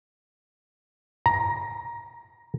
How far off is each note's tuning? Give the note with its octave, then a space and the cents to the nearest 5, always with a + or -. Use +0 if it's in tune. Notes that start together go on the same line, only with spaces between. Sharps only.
A#5 +15